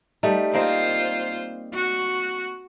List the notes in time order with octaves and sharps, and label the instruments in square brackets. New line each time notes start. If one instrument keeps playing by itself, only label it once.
[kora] G3 A3 D#4
[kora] A#3 C4 D#4 [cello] F4 C5
[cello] F#4